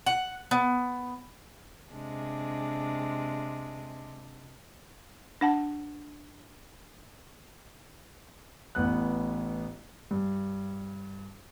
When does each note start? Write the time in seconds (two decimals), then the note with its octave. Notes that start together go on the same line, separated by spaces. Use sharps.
0.06 F#5
0.51 B3
1.92 C3 G#3 D4
5.41 D4 F#5 A5
8.75 A1 B3 F#6
10.11 G2